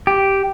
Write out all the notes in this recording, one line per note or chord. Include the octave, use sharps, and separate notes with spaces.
G4